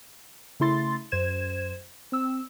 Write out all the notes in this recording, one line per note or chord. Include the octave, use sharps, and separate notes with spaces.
C#3 A3 E4 C6 A6
F#2 C5 G#6 E7
C4 E6